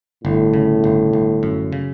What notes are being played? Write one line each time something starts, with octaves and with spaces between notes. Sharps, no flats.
G1 A2
C#3
G1
G1
F#2
C#3